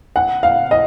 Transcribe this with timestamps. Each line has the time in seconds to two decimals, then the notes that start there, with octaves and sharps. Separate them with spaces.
0.16 F#5
0.43 F5
0.71 D#5